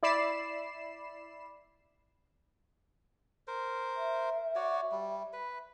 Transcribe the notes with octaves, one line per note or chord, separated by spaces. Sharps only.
E4 D5 B5 C7 E7
A#4 C5
E5
F#4 C#5 D5
G3
B4